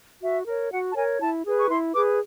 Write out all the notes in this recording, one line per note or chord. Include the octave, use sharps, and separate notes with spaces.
F#4 E5
A#4 C#5
F#4 F#5
A5
A#4 C#5 G#5
E4 A5
G#4 B4
C#6
E4 C6
G#4 B4 D6